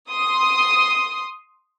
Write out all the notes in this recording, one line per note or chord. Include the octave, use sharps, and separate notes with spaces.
C6 D#6